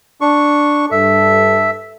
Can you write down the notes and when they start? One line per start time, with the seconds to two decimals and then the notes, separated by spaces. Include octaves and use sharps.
0.21 D4 C#6
0.91 G2 A4 E5